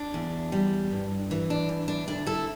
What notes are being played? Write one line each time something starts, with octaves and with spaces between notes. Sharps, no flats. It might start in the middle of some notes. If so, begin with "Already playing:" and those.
Already playing: D4
E2
G3
G2
E3
D4
E2
D4
D2 D4
E4 A4